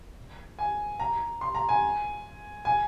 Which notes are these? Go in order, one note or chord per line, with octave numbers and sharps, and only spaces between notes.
G#5
A#5
C6
A#5
G#5
G#5